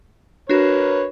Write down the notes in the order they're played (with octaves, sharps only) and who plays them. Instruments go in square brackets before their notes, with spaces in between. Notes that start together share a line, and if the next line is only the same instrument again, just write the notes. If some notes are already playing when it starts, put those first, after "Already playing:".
[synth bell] D4 F#4 [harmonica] A#4 B4 C#5